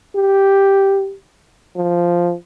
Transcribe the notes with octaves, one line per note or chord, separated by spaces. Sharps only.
G4
F3